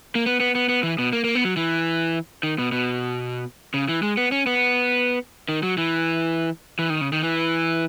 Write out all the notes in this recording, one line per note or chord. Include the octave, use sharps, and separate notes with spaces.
A#3
B3
B3
B3
B3
E3
B2
A#3
A#3
B3
F#3
E3
D#3
B2
B2
C#3
E3
G#3
B3
C#4
B3
D#3
F#3
E3
E3
D#3
C#3
D#3
E3